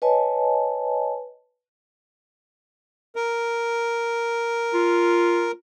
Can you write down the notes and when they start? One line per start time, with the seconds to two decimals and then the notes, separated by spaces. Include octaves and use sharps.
0.02 B4 C#5 D#5 G#5 A5
3.16 A#4
4.74 F4